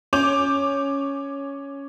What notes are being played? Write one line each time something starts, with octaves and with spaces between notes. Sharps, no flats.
C#4 C#5 D6 G6 F7